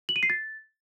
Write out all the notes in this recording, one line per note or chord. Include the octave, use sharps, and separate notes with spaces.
F#7
D#7
C7
A6